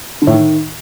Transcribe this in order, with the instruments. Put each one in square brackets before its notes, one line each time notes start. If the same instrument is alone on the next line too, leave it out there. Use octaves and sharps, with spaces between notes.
[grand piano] D3
A2
D#3